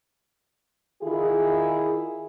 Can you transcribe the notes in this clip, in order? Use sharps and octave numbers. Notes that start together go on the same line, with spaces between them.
D#3 E4 F4 G#4